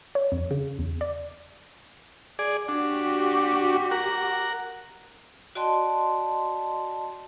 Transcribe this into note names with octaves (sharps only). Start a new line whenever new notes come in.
C#5
F2
C#3
E2
D5
G#4 D5
D4 F#4 G4
A#4 F#5
F#4 D5 D#5 G5 A5 C6